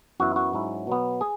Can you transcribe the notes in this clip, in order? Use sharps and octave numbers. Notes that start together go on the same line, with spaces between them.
F#2 E3 B3 E4 F#4
F#4
G#2 F#3 C#4 E4
B2 F#3 B3
G#4